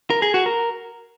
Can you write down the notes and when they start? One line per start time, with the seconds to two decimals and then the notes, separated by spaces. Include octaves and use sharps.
0.10 A#4
0.22 G#4
0.34 F#4
0.46 A#4